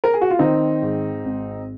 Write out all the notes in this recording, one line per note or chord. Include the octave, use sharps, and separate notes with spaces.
A#4
G#4
F#4
F4
D#3 C4 D#4
G#2
G#1